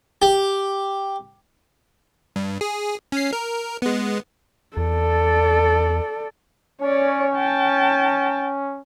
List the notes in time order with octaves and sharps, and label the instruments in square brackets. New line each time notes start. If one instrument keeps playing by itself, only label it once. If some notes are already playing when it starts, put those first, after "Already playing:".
[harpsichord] G4
[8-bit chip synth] G2
G#4
C#4 C7
A#4
G#3 B3
[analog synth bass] E2 [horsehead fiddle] A4 D5
[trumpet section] C#4 [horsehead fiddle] C#5 D5
[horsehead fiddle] G5 A5